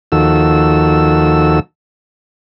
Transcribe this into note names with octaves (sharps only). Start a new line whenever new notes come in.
D#2 D#3 F3 F#4 A4 E6